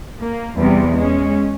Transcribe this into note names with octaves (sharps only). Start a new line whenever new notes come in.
A#3
E2 C3 G3
G#3 C#4